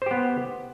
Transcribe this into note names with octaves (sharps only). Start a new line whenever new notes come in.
B3 G4 C5